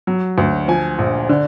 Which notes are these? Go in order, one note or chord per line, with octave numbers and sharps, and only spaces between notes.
F#3
D2
F3 G#5
A#1
D3